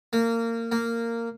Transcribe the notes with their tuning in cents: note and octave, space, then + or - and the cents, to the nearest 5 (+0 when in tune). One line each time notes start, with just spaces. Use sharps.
A#3 -25
A#3 -15